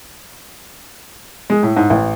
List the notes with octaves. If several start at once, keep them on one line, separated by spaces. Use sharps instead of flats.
G#3
A2
G#2
A1